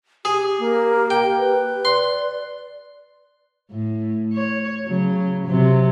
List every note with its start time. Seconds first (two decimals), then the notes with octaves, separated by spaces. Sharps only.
0.25 G4 G#4
0.59 A#3
1.10 G5
1.39 B4
1.85 D5 C6
3.71 A2
4.33 C#5
4.86 C#3 F#3
5.46 C3 F#3